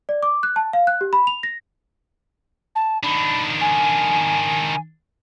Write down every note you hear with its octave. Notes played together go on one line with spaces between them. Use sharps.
D5
D6
F#6
A5
F5
F#6
G4
B5
F7
A#6
A5
D#3 D4 B5
G#5